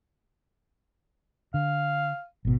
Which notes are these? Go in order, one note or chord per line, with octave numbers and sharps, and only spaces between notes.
D3 F5
G#1 B2